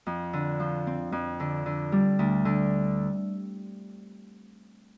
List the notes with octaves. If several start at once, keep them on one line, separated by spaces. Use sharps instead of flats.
F2
D3
F3
C4
F2
D3
D3
G3
D2
D3